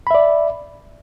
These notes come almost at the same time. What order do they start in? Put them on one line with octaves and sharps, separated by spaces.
B5 E5 D5